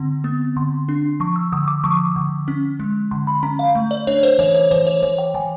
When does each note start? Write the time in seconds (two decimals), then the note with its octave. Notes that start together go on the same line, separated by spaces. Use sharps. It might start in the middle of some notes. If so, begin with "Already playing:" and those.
Already playing: D3 C4
0.24 B3
0.56 D3 C6
0.89 D4
1.20 F3 C#6
1.36 E6
1.52 D3 D#6
1.68 D6
1.84 F3 C#6
2.16 D3
2.48 C#4
2.80 G#3
3.11 D3 C6
3.27 B5
3.43 C#4 A#5
3.59 F5
3.75 A3
3.91 D5
4.07 D4 C#5
4.23 C5
4.39 E3 C#5
4.55 C#5
4.71 E3 C5
4.87 C#5
5.02 E3 C#5
5.18 G5
5.34 E3 G#5